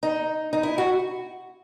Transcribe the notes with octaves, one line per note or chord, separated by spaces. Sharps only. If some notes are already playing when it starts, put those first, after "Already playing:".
D#4
D#4
E4
F#4